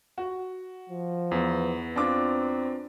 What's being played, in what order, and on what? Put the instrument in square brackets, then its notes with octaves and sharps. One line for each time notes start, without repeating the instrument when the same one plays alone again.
[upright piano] F#4
[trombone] F3
[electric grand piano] E2 B3
[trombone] C4 [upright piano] D4 F4 D6